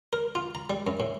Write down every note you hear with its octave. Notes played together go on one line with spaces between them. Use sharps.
A#4
F4
A#5
G3
F#2
A2